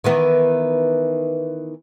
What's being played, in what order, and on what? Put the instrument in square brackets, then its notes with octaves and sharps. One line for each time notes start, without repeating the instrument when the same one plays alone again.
[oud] D#3 E3 B3